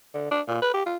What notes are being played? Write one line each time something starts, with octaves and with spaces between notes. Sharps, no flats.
D3
D4
A#2
B4
G4
F4